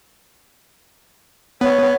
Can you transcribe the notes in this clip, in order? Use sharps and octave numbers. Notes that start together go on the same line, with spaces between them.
B3 C#5